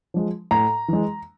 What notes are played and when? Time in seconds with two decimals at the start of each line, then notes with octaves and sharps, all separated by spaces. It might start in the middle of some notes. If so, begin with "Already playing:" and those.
0.14 F3 G#3
0.51 A2 A#5
0.88 E3 G#3